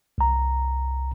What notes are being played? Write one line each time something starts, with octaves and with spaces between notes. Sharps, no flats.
C2 A#5